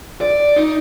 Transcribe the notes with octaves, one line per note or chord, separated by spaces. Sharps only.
D5
D#4